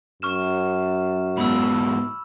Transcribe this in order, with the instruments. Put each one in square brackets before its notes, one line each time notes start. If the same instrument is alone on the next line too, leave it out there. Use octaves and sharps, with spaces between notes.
[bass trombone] F#2 [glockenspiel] C#6 F6 E7
[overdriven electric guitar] G#2 B2 [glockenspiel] B5 E6